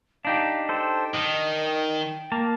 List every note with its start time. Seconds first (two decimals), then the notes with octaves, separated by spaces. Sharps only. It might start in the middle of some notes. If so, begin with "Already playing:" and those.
0.25 D4 D#4 G4 F5
0.69 A4 C5 G5
1.14 D#3 D#5
2.32 A#3 A5